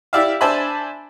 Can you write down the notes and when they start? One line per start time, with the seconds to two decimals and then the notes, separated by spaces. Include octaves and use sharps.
0.13 E4 G4 D5 E5 F5
0.41 D4 C5 E5 G#5 A5 B5